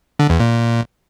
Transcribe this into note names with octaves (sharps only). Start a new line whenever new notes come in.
D3
E2
A#2